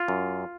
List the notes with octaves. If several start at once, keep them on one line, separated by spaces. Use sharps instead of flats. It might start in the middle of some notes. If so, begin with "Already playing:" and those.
Already playing: F4
F#2